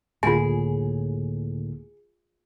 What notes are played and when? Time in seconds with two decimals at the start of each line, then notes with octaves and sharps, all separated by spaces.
0.23 C#2 A2 D3 A#3 F4 G#4 G#5